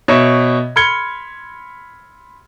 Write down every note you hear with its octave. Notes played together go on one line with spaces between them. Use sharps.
B2 C#5 E5
B5 C6 F6 G#6 C#7 G7